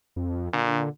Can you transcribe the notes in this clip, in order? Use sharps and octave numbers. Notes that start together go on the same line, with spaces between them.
F2
A#2 D3